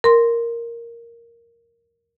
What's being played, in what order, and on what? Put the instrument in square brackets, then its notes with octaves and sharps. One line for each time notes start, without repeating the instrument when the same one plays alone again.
[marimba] A#4 C6